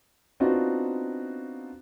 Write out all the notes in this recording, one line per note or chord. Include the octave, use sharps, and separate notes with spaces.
B3 C4 D4 D#4 F4 F#4